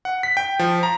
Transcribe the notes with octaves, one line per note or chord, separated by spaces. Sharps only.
F#5
B6
G5
F3
A#5